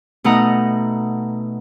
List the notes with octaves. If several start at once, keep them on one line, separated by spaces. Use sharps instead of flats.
B2 A3 D#4 F#5 A#5 D#6